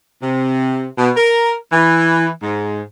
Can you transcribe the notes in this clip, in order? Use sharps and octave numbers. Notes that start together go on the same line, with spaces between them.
C3
B2
A#4
E3
G#2